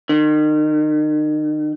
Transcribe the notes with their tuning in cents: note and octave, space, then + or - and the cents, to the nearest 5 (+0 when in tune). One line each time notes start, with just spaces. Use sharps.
D#3 -35